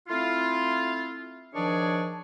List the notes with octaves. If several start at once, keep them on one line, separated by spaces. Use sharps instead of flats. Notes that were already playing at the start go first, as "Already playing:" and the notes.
A3 C4 E4 F4
D#3 F3 D4 G#4 C#5 D5